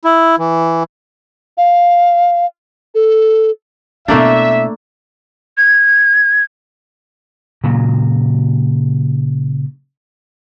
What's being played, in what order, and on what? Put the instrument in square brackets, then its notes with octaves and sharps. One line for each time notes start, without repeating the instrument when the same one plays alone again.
[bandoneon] E4
E3
[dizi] F5
A4
[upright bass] B2 E4 [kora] A3 A#3 D4 [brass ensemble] E5
[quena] G#6
[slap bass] A#2 C#3 F#3